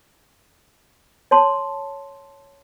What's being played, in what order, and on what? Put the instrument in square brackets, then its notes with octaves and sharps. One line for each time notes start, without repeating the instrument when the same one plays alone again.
[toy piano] C#5 A5 C6